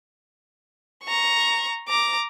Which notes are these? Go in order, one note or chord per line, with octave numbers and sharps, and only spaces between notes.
A#5 C#6
A#5 D6